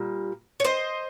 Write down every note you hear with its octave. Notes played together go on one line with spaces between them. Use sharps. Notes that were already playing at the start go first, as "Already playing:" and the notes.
Already playing: A#2 G3
C#5
C5 D#5